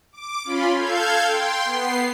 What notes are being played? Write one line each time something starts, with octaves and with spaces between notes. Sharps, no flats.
D6
C#4 F4 B5 C6
A4 F5 G6 G#6
G5 C6
B3 C7